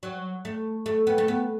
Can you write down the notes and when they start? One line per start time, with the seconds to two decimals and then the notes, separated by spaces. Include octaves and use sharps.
0.03 F#3
0.45 A3
0.86 A3
1.07 B3
1.18 A3
1.28 B3